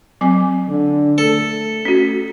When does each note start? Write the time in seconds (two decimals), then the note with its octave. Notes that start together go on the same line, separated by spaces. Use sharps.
0.21 F#3 C4 G#5
0.69 D3
1.18 A3 A4
1.85 C#4 F#4